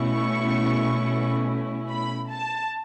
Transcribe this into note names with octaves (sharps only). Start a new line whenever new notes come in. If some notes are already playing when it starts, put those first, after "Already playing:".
Already playing: B2 A3 C#4 E4 C#6
B5
A5